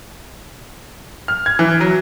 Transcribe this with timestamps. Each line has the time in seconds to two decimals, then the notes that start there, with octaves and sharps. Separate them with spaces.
1.28 F6
1.46 G#6
1.59 E3
1.80 F#3